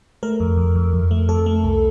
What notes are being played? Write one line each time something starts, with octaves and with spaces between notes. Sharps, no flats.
A3 A#4
F2
F2
F2
F2
A3
F2 A4
A3
C2